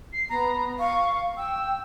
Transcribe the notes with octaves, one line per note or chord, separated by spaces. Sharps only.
C7
B3 A#5
F5 C#6
G5 E6